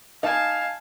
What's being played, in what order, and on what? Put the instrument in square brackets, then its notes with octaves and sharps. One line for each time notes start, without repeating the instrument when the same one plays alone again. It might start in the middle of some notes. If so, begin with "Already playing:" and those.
[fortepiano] D#4 [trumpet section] F5 [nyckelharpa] G#5 A5